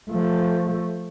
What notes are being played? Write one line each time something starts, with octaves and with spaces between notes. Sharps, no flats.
F3 A3